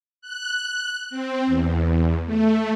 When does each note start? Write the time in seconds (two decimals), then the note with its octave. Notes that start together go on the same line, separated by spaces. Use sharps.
0.22 F#6
1.10 C4
1.46 E2
2.25 A3